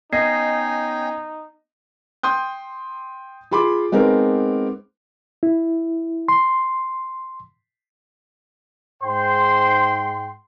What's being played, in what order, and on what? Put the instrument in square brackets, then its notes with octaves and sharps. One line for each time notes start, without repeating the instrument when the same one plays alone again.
[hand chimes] B3 G#6 C7 [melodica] C#4 G5 G#5 [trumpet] D#4 [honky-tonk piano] D#5
[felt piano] G5 C6 D#6 G6
F4 G#4 B5 C6 D6
G#3 B3 C4 D#4 A#4
[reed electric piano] E4
C6
[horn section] G#2 G5 C6 [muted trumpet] C5